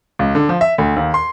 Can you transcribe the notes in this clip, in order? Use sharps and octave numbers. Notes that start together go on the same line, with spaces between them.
C#2
D3
F3
E5
D2
D#2
C6